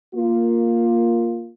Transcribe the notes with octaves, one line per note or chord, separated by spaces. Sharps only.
A#3 F4